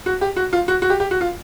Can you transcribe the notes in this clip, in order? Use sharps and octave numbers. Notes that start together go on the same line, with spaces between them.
F#4
G4
F#4
F4
F#4
F#4
G4
G4
F#4
F4